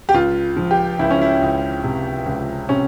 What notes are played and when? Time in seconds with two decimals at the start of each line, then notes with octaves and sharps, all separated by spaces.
0.09 G4
0.14 C#2 F4
0.56 F3
0.71 G4
0.99 C#2 E4
1.11 C#4
1.22 E4
1.41 C#2
1.84 C3
2.26 C#2
2.69 C3 C#4